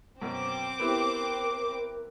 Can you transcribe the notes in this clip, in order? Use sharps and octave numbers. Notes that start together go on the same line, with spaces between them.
F#2 B2 C4 D6
B3 E4 G4 A#4